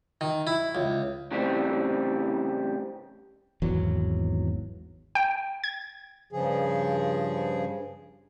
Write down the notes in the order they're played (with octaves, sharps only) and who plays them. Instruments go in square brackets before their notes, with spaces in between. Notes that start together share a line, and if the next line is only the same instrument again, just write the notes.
[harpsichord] D#3
E4
C#2
[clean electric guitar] A2 C#3 E3 G3 C4
[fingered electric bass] G#1 E2 F#3
[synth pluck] G5
G#6
[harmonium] G2 C#3 F3 G#4